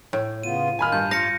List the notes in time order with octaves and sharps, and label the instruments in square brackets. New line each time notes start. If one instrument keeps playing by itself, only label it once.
[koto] A2
[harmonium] C#3 B3 F4 [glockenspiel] D#7
[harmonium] D#3 F4 [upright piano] G#5 B5 F6
[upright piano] G2 [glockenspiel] G6
[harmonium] F4 [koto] F5 [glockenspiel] A#6 C#7